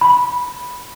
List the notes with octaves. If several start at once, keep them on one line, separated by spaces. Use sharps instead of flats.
B5